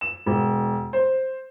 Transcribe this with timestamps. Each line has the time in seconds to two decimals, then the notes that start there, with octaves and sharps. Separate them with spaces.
0.01 E7
0.26 E1
0.93 C5